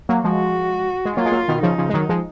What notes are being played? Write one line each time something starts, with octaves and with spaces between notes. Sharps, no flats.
F#3 A#3
F3 G#3 F#4
G#3
F#3 A#3 F4
G#3
F#3 A#3
B2 D#3
C#3 F3 D#4
C#3 F3
G#3
D#3 F#3
F3 G#3